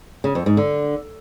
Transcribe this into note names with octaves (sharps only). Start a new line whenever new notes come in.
C#3
F2
G#2
D3